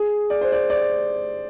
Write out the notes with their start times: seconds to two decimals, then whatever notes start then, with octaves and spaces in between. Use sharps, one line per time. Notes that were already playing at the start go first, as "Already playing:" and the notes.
Already playing: G#4
0.30 D5
0.41 C5
0.52 D5
0.70 D5